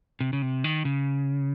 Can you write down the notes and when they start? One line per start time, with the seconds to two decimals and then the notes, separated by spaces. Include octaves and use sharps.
0.20 C3
0.33 C#3
0.42 C3
0.64 D#3
0.85 C#3